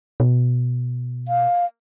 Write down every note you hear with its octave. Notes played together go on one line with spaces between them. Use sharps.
B2
F5